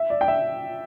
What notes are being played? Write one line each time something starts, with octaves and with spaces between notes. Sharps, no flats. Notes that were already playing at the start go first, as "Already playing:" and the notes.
Already playing: E5
D5
G5
E5